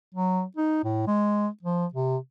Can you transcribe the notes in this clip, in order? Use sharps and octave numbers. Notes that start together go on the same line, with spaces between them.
F#3
D#4
A2
G#3
F3
C3